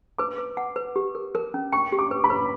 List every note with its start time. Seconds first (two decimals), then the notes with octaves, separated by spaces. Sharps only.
0.18 B4 D6
0.38 B4
0.57 F#5
0.76 B4
0.96 G4
1.15 A#4
1.35 A#4
1.54 C#4
1.72 G5 C#6
1.92 G4
1.99 D6
2.11 B4
2.24 B5
2.30 B4